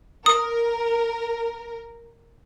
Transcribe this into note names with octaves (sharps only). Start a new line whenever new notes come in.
A#4 D#6